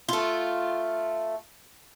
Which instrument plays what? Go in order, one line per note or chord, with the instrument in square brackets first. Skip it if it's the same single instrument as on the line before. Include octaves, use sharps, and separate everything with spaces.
[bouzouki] A3 F4